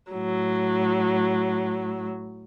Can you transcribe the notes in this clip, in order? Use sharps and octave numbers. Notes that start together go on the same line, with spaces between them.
A2 F#3